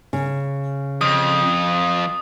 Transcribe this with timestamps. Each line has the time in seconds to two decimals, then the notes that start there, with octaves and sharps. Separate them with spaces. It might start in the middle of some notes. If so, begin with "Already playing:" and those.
0.13 C#3
1.01 F2 D#6